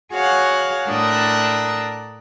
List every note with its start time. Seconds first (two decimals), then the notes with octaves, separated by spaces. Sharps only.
0.14 F#4 G#4 C#5 F5 F#5
0.89 A2 D4 A#4 D#6 E6 F#6